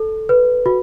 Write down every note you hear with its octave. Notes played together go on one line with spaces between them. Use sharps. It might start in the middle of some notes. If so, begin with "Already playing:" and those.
Already playing: A4
B4
F#4